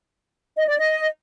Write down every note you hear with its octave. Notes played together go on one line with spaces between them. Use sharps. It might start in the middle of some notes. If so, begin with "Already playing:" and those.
D#5
D5
D#5